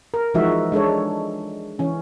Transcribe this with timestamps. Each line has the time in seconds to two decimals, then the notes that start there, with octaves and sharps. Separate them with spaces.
0.14 A#4
0.34 E3 F3 G#3 D#4 F#4 E5
0.72 G#3 D4 A4 C#5
1.79 E3 C#4